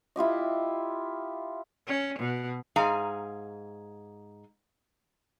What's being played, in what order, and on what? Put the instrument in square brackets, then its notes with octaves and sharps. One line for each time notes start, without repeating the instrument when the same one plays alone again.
[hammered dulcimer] E4 F4 G4 D#5
[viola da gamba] C#4
B2
[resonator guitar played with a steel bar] G#2 G#4 F5 G#5 A#5